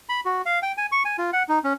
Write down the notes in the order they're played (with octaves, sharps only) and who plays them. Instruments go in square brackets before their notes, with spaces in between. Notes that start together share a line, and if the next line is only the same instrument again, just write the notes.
[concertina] B5
F#4
F5
G5
G#5
C#6
G#5
F4
F#5
D#4
C#4